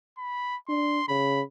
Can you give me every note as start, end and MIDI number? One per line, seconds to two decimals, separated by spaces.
0.18 0.56 83
0.68 1.00 62
0.68 1.06 84
1.08 1.42 49
1.08 1.43 83